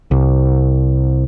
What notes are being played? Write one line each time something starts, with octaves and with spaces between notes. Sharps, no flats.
C2